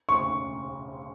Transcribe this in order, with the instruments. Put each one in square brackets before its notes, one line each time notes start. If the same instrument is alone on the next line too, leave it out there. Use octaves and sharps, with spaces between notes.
[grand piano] C#6